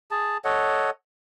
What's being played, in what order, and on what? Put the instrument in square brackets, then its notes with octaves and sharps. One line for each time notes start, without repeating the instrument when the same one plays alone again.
[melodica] G#4 A5
A4 C#5 D#5 F#5